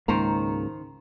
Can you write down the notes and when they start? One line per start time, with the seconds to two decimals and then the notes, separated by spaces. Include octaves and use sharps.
0.08 C#2 G#2 D#3 A#3 C5 A#5